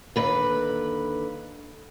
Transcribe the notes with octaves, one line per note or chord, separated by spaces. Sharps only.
D#2 D3 B4